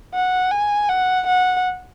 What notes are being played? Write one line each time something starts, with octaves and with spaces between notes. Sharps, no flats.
F#5
G#5
F#5
F#5